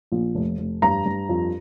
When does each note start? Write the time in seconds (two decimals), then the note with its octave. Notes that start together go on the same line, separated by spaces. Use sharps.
0.12 A#1
0.35 F1
0.58 F1
0.82 G2 A#5
1.06 G2
1.29 F2